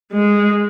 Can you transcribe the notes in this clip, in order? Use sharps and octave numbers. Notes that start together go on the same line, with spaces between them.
G#3